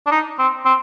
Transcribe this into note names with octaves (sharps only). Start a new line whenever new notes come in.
D4
D#4
C4
C4